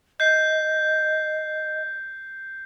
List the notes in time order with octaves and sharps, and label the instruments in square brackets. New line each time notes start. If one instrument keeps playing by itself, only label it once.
[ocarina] D#5 [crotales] G6 C7